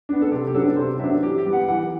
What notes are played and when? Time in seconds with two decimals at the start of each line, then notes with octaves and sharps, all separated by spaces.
0.09 B3 D4
0.22 A4
0.31 C3 G4
0.47 G4
0.54 F#3 B3 D4 A4
0.76 C3 C5
0.99 F#3 B3 D4 E5
1.22 E3 G4
1.38 G4
1.45 G3 B3
1.53 F#5
1.68 E3 F#5